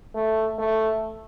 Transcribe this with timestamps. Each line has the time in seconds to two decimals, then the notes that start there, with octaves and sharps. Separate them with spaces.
0.15 A3
0.58 A3